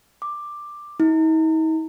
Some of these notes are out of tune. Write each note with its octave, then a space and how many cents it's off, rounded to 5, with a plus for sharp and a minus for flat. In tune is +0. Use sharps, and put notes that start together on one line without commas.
D6 +10
D#4 +45